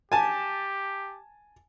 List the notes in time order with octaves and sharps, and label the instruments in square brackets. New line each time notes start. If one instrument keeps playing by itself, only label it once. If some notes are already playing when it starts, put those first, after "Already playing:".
[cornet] G4 [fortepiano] G#5 A5